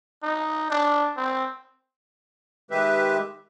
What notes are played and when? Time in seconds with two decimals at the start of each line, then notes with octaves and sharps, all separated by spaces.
0.23 D#4
0.70 D4
1.17 C4
2.71 D#3 G#3 G4 B4 E5